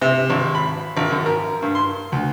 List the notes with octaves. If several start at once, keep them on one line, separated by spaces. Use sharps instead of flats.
C3
G#1
B5
G#1
F#2
A#4
G2
C6
D2